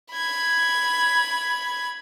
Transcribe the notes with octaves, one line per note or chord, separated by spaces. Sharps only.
B5 G#6